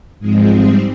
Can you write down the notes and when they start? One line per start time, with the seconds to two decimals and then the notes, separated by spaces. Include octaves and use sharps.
0.20 G#2 F3 G#3 C4 G#4
0.49 G#2 G3 C4 G#4